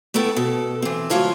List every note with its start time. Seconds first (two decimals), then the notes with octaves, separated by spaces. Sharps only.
0.14 A3 B3 E4 A4 G5
0.36 B2 A4
0.82 E3 C4
1.10 D2 F#3 E4 F4 C#5 A5